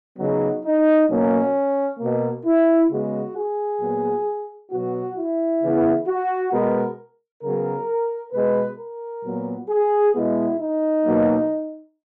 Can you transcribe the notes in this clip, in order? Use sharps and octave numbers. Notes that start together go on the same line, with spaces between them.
C#3 F#3 B3 D#4
D#4
B2 F#3 A#3 C#4
B2 A#3
E4
C#3 G#3 B3 F#4
G#4
A#2 F#3 B3
B2 F#3 B3 F#4
E4
C#3 E3 B3
F#4
B2 G#3 B3 A#4
C#3 F#3 B3 A#4
B2 G#3 B3 B4
A#4
A#2 F#3 B3
G#4
B2 G#3 B3 E4
D#4
B2 F#3 A#3